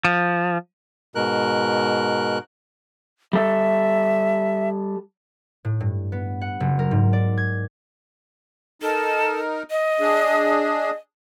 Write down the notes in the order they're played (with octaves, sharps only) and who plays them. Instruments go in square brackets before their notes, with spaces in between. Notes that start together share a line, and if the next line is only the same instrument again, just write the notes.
[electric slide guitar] F3
[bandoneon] G#2 B2 A#4 F#6
[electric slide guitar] G3 A4 [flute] E5
[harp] A2
G2
B3
F#5
F#1
A#4
G#2
D5
G#6
[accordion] D#4 A#4 [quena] A4
[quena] D#5
[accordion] D4 G#4